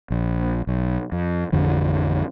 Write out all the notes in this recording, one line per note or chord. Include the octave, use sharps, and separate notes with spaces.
A#1
B1
F2
A1 F2 D3 F3